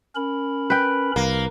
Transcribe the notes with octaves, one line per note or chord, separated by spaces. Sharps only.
C#4 A#4 B5
B4 G5
C2 A#3